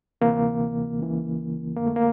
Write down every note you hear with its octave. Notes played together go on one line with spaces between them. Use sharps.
D2 C3 E3 A#3
C#2 C#3 E3
F2 D3 A#3
A3
A#3